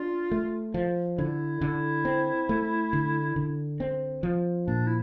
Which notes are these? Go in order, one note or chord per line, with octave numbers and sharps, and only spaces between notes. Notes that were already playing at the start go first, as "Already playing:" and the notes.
Already playing: D4 F4
A3
F3
D3 E4
D3
C4
A3
D3
D3
C4
F3
A#2 D4
E4